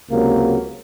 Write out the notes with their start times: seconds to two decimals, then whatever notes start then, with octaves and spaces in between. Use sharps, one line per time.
0.11 C#2 C3 F#3 A#3